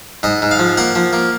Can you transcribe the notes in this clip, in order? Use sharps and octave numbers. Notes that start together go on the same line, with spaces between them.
G#2 D#5
G#2
F5
F3
A#3 F#5
F3
A#3